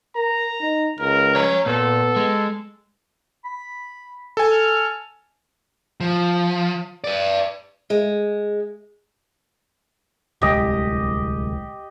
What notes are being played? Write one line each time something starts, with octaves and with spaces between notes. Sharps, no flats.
A#4 A#5
D#4
C#2 A#4
C#4 C#5 A#5
A#2 B3 A4
G#3
B5
A4 G#5
F6
F3
B4 D5
G#3
D1 C2 G#3 G4 D#5